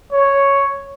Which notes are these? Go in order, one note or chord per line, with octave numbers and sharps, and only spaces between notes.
C#5